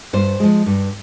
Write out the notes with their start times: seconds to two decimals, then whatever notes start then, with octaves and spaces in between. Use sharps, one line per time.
0.13 G2 C5
0.40 F3 G#3
0.66 G2